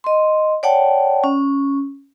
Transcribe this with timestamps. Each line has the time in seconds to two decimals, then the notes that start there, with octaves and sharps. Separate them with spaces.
0.04 D#5 C6
0.63 C#5 D5 F#5 G5 A5
1.24 C#4